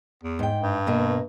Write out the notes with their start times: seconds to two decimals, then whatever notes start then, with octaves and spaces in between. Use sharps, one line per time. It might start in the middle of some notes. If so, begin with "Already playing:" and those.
0.23 E2
0.39 G#2 G5
0.61 G2
0.87 B2 A#3